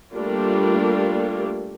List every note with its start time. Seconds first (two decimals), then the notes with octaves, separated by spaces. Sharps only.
0.14 G3 A3 A#3 D4 F4